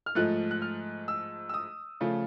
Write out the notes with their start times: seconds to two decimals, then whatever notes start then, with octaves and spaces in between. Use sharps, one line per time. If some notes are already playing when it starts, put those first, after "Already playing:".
0.06 F6
0.15 G#2 F3 A3 F#6
0.51 F#6
0.62 F6
1.08 E6
1.49 E6
1.54 D#6
2.01 C#3 F3 A3